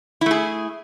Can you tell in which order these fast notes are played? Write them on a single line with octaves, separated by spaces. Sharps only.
E4 A3 G#4